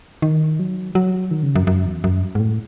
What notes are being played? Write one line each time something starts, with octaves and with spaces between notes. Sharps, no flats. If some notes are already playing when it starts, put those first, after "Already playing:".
D#3
F#3
F#3
D#3
C#3
F#2
F#2
E2
F#2
G#2
A2